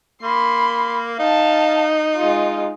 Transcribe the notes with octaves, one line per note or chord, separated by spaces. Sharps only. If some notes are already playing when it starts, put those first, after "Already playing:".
A#3 B5 C6
D#4 F5 A5
G#3 F4